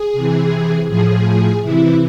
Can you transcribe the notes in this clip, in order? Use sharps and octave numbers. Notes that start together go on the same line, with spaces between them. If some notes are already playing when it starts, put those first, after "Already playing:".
Already playing: G#4
C3 E3
A2 F3 G#4
C3 E3 E4